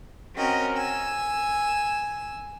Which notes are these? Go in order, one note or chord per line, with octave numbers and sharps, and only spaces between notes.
C4 C#4 F#4 A#4 D#5 G5
G#5 E6